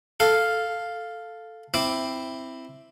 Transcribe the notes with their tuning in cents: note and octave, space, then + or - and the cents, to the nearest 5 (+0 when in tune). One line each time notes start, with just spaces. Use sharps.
A4 +0 F5 +0
C4 +0 E4 +0 D6 +0